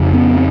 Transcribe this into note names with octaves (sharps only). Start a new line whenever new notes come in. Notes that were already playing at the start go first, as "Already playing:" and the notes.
Already playing: F2 C#3
B3 C#4
C4